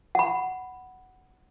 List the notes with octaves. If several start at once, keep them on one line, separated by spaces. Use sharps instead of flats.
F#5 B5